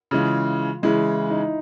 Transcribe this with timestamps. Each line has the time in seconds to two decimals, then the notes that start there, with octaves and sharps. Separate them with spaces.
0.11 C#3 E3 G#3 F4
0.82 C#3 E3 G#3 E4
1.30 D#4